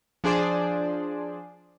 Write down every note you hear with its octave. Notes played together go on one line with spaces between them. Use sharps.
F3 D4 G#4 C5 D5